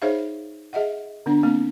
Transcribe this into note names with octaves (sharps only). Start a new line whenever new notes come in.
D#4 G#4 C5 C#5 E5 F5
G#4 D#5 E5 F#5
D3 B3 D4
A#3 C4